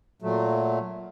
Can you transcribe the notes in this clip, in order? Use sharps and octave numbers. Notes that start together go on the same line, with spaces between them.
A#2 F#3 A3